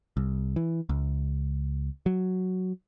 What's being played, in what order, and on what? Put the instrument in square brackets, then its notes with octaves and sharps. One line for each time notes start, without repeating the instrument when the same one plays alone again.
[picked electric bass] C2
E3
C#2
F#3